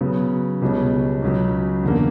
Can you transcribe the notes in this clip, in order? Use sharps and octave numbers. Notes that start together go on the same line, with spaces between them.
C#3 F#3 B3
C#2 B2 G3 C#4
C#2 C#3 F#3
E2 D3 A#3